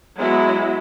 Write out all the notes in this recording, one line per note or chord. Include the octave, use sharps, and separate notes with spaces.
F#3 G#3 B3 E4